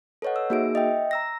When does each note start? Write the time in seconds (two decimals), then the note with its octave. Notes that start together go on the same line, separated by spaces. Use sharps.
0.22 A4 B4 C#5 D#5 F#5
0.36 E6
0.50 A#3 D#4 F#4 G#4 E5 D7
0.75 D#5 E5 G5
1.11 A#5 E6 A#6